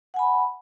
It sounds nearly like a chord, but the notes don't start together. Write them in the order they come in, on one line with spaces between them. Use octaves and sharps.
F#5 G#5 B5